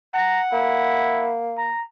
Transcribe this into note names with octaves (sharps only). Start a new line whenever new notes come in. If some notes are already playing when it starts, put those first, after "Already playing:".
F#5 A#5
A#3 E4
A#5